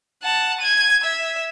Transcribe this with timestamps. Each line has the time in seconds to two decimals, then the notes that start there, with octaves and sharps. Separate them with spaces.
0.23 F#5 A5
0.60 G#6 D#7
1.04 E5